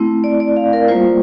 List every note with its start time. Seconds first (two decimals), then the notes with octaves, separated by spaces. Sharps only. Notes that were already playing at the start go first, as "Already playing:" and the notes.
Already playing: A3 C4 E4
0.24 D5
0.40 D5
0.56 F5
0.73 A#4
0.88 G3 A#3 F4 C5